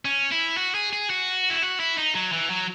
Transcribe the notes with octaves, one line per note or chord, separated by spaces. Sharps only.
C#4
E4
F#4
G#4
G#4
F#4
E4
F#4
E4
D#4
F#3
E3
F#3